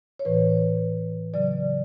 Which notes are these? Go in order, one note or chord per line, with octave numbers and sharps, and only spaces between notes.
C#5
A2 E3 B4
C#3 F#3 D5